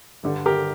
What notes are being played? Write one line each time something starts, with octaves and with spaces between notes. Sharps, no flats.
G2 D3 G3 D4
G4 A#4